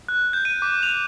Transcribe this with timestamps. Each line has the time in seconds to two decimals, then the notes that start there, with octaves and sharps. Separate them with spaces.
0.09 F#6
0.33 G6
0.45 D#7
0.62 D6
0.83 F7